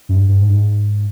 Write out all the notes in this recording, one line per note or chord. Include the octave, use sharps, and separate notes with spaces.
F#2
G2
G2
G#2
G2
G#2